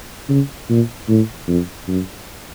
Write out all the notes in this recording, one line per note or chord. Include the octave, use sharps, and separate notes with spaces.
C#3
A#2
A2
F2
F#2